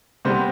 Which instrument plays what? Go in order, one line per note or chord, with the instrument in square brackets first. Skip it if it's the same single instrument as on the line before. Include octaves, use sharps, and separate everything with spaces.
[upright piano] C3 G3 B3 C5